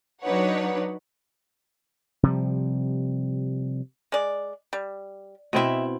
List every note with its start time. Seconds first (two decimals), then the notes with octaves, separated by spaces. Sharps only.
0.22 F#3 D4 D#4 B4 C#5 F#5
2.23 C3 F3 G3
4.12 G#3 D5
4.73 G3
5.53 B2 C4 E4 D#5 E5